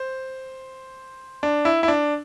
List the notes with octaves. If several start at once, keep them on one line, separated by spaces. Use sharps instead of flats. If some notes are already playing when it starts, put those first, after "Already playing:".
Already playing: C5
D4
E4
E4
D4